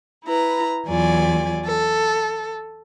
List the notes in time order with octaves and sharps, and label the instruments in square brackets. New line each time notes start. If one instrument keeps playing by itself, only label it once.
[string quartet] E4 B4 A#5
E2 F#3 F4 D5 G#5
A4